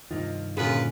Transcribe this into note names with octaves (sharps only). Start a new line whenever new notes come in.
G2 C3 D#3 F4 D#5
F#2 A#2 D3 F4 G#4 B4